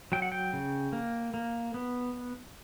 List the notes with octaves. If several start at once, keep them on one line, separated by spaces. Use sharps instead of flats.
F#3 G5
F#5
G5
C#3
A#3
A#3
B3